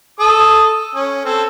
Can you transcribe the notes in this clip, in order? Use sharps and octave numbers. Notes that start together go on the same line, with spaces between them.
A4 D#6
C#4
C4 A4